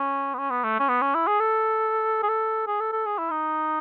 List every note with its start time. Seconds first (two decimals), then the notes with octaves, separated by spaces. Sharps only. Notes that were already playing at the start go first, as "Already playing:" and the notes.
Already playing: C#4
0.35 B3
0.38 C#4
0.51 B3
0.64 A3
0.79 C#4
0.89 B3
1.02 C#4
1.14 E4
1.27 G#4
1.40 A4
2.23 G#4
2.29 A4
2.67 G#4
2.80 A4
2.93 A4
3.06 G#4
3.18 E4
3.31 D#4